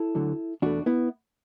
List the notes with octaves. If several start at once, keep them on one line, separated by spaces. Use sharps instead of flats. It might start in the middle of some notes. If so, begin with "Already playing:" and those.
Already playing: E4 A4
D2 D3 F#3 A3
E2 B2 A3 D4 F#4
B3 E4